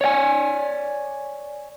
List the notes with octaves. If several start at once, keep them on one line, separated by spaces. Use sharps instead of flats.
C#5 D5 F#5 G#5